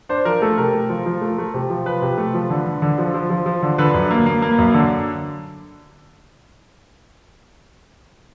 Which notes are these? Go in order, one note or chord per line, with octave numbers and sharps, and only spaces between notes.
D4 C5
F3 A#4
A3 A4
C3 A#4
A3
F3
F3
A3
A3
C3
F3
F3 B4
C3
A3
F3
D3
D3
D3
F3
F3
F3
F3
D3
D3 B4
F#2
A#3
A#3
A#3
F#2
D3